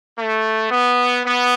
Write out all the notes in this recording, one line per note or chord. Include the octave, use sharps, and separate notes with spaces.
A3
B3
B3